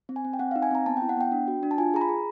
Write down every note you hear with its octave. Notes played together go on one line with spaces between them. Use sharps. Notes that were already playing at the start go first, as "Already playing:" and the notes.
C4
G#5
C4
G5
C4 F#5
D#4 F5
G#5
C4 A#5
B3 A5
E4 G5
F#5
B3 G5
D4
F#4
D4
A5
F4 G#5
G#4 A#5
B5
G#4